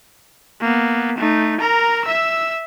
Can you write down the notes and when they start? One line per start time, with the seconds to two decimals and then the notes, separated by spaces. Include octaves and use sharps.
0.61 A#3 B3
1.18 A3 D#4
1.60 A#4 A#5
2.05 E5 E6